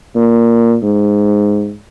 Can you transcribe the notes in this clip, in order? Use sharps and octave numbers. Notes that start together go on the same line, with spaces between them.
A#2
G#2